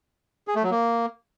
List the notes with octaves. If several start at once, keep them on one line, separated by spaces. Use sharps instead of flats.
G#4
A3
F#3
A#3